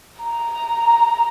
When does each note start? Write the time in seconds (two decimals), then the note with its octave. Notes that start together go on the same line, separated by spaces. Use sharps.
0.22 A#5